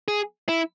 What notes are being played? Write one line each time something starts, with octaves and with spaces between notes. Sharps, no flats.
G#4
E4